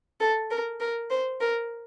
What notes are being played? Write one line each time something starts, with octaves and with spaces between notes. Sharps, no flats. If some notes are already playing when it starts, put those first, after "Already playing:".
A4
A#4
A#4
C5
A#4